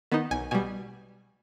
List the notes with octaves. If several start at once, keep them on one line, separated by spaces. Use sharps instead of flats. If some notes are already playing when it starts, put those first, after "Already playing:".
D#3 B3 D#4
B1 G#5
B2 G3 G#5